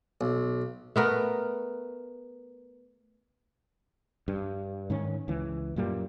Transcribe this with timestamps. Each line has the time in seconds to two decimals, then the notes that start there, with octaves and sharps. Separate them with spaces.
0.21 B1
0.96 A3 B3 A#4
4.28 G2
4.90 G#2 D#3 C#4
5.28 C#2 E3
5.76 F#2 A#2 G3 A#3